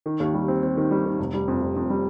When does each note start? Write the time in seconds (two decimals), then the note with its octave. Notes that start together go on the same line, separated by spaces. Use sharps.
0.06 D#3
0.20 D#2
0.34 G3
0.48 C4
0.63 C4
0.77 D#3
0.91 G3
1.05 D#3
1.19 F1
1.34 G3
1.48 F2
1.61 F1
1.76 F2
1.90 G3